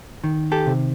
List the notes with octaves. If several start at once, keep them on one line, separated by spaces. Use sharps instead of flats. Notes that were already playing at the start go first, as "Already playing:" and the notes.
D#3
G4 A4
C3